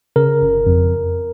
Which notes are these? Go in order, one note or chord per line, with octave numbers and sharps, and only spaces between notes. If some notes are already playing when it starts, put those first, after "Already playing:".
C#3 A#4
G1
F2